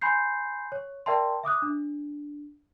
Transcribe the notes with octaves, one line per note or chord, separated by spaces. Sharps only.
G#5 B5 C6 G6 C7
C#5
A#4 D5 E5 G5 A5 C6
E5 D6 D#6 F#6
D4